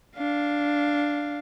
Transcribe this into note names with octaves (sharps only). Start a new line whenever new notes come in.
D4 F5